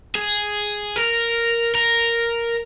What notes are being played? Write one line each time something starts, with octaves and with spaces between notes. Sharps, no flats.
G#4
A#4
A#4